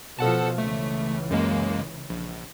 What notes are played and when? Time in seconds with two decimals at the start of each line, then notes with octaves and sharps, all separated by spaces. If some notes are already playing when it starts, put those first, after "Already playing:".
0.19 B2 F3 A4 F#5 A5
0.58 C#2 C#3 E3 A3
1.31 F#2 G#3 A#3
2.10 A#1